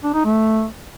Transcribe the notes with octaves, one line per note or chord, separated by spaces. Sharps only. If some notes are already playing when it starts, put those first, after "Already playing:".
D4
D#4
A3